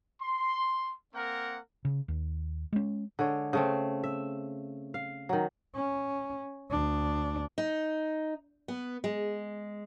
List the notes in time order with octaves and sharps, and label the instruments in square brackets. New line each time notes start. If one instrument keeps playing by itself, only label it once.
[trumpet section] C6
A#3 C4 A#4 F#5
[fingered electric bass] C#3
D#2
G#3 C#4
[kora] D3 G#3 C#5
C#3 A3 C4
E5
F5
D#3 F#3
[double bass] C#4
D2 D4
[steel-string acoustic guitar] D#4
B3
G#3